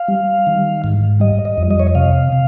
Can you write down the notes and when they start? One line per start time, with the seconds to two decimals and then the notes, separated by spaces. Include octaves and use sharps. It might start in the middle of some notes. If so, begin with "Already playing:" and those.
Already playing: F5
0.08 G3
0.47 D#3
0.84 G#2
1.20 G3 D#5
1.45 D#5
1.58 F2
1.71 D#5
1.79 C#5
1.87 D#5
1.95 C3 F5
2.32 C3